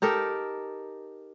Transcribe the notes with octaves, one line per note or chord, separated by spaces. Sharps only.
D#4 G4 A4 A#4